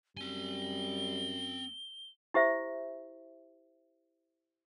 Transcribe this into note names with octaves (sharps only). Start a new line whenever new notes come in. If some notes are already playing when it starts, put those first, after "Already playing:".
F#2 G3 C4 G#5 G7
E4 G4 C5 E5